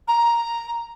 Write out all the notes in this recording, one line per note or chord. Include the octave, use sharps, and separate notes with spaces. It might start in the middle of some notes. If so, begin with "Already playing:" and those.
A#5